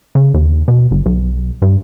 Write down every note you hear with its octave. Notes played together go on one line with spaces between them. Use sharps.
C#3
D#2
B2
G1
B1
G2